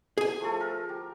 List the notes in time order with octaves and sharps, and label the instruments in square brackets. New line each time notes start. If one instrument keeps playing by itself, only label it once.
[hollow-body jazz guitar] G#4 G#5
[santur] F3 A3 A4
A#4
G4